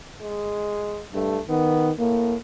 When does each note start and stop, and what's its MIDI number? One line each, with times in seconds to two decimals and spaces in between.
0.21 1.04 56
1.14 1.38 43
1.14 1.41 57
1.49 1.92 51
1.49 1.89 59
1.99 2.34 45
1.99 2.35 58